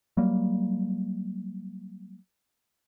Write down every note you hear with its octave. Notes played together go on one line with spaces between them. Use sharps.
F#3 G3 A#3